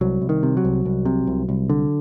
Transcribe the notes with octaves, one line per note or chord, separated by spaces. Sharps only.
C2 F#3
C2
D#3
C3
F#3
C2
C2
C3
C2
C2
D3